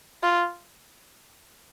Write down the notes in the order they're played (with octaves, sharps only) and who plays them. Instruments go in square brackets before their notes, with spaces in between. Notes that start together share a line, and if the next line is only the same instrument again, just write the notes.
[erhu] F4